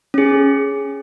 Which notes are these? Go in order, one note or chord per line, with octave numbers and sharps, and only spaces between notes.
C#4 G#4